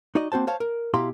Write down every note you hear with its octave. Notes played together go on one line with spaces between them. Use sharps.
D#4 F#4 D5 D#5
A#3 C4 F#4 C5 A5
C5 C#5 F5 A5
A#4
B2 E4 G4 F5 A#5 C6